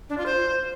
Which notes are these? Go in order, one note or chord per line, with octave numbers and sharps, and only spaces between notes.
D4
F4
C5